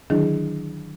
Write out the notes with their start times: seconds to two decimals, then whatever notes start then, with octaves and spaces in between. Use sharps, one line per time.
0.10 D3 D#3 F#3 D4 E4 G#4